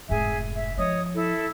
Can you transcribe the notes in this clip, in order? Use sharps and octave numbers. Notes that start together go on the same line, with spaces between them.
F1 G#2 G#4 E5 G#5
E5
F3 C#5 D#5 D#6
E4 A4